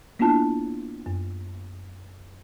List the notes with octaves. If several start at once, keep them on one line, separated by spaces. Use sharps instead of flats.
A#3 B3 D4 E4 F4 A5
F#2